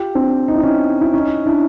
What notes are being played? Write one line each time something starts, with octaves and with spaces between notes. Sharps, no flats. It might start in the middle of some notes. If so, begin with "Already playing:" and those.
Already playing: F4 G4
C4 D4
D#4
E4
C#4 D#4
E4
C#4 D#4
D4 E4